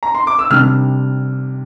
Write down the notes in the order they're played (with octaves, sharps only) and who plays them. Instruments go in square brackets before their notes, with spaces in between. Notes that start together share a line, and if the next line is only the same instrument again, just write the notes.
[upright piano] A#5
C6
D6
E6
C3 G3 D4 F6